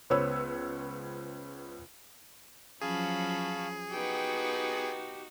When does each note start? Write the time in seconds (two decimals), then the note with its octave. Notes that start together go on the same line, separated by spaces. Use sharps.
0.10 C#2 B3 C5 C#5 E6
2.81 F3 F#3 C#4 G#4 F5 A5 B5 C#6
3.91 B3 D#4 F#4 G4 G5